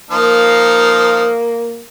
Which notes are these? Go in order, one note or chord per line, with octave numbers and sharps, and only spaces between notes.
F3 A#3 D#4 F5